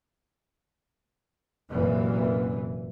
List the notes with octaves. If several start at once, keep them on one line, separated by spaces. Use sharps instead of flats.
F1 F#2 A#2 E3